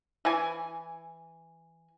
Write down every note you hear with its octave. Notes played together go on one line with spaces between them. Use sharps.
E3 G#5